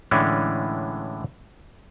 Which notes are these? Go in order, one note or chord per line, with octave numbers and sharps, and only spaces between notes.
A2 D3 E3 G#3 C#4 D4